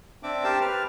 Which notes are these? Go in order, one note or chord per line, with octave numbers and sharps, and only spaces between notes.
C4 D4 E5 D6
G4 A#4 C5 G5 A5
B4 F6